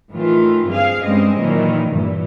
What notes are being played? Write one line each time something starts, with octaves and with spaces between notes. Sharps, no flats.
A2 D#3 E3 F4
G2 C4 G#4 F5
G2 G3 G#3 C4 C#4 D#5
A#2 D#3 E3 F#3
G2 A#2 E3